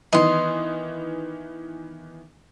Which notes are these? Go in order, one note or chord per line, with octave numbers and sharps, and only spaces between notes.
D#3 E3 B3 D#5 C6